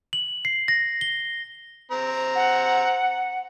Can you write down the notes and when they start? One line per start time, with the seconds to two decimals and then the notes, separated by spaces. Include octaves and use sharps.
0.13 F#7
0.45 C7
0.68 A#6
1.01 G7
1.92 C4 A#5
2.35 F#5